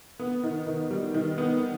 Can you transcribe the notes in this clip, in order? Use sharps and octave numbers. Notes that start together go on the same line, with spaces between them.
B3
D#3
D#3
G3
D#3
B3